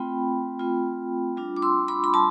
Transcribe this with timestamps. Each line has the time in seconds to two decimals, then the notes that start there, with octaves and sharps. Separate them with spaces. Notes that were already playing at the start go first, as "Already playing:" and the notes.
Already playing: A3 C4 F4 G5 B5
0.60 A3 C4 F4
1.37 G3 D4 F4
1.57 D6
1.62 C6 E6
1.88 B5 D6
2.04 B5
2.14 G3 A5 C6